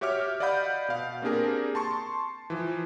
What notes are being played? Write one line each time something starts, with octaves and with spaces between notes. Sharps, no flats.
F#4 G4 C#5 E5 D6 F6
D5 D#5 F5 F#5 B5 G6
B2 F5
A#3 C4 D4 G4 G#4 A#4
A5 C6 C#6
E3 F3